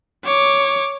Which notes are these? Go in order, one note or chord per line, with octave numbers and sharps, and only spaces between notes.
C#5 D6